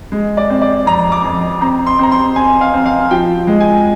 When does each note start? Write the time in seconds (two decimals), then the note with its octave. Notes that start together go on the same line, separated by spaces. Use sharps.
0.12 G#3
0.37 D5
0.50 C4
0.62 D5
0.86 F2 A#5
1.12 D6
1.25 F2
1.61 C4 A#5
1.86 C6
1.99 C4 A#5
2.12 C6
2.36 C4 G#5
2.61 F5
2.74 C4
2.86 F5
3.11 F3 G5
3.47 G#3
3.60 G#5